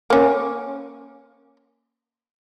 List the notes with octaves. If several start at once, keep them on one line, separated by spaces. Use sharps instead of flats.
A#3 C#4